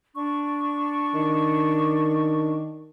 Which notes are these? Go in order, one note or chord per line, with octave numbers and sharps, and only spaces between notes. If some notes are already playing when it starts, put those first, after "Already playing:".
D4 C#6
D#3